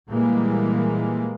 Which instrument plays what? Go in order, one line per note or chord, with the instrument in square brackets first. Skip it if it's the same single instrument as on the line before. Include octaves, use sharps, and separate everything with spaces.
[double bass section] A#2 E3 G3 G#3 A#3